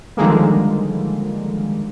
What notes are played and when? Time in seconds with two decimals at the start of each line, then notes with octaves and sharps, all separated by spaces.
0.17 D3 D#3 F3 G3 G#3 A#3